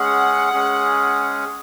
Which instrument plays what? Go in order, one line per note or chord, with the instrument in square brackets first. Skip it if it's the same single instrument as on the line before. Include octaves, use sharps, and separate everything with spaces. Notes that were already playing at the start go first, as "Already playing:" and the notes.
Already playing: [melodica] G#3 C#4 G#4 [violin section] F#5
[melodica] G#3 C#4 G#4